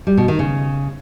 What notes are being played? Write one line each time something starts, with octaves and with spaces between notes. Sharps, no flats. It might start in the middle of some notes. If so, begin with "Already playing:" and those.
G3
B2
D#3
C#3